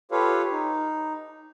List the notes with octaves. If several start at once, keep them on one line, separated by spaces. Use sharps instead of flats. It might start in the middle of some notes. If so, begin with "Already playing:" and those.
F4 G4 A4 B4 C#5 F5
D#4